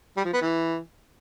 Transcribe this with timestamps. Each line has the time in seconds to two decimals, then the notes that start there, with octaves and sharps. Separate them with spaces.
0.17 G3
0.25 F3
0.33 B3
0.41 E3